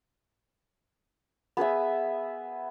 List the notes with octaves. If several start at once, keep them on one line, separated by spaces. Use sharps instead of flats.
B3 G#4 B4 E5